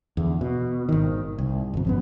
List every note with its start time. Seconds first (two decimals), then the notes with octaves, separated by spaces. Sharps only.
0.17 E2 D3
0.41 B2
0.89 G#1 D#3
1.38 C2
1.74 G1 F2
1.85 G#1 F#2 B3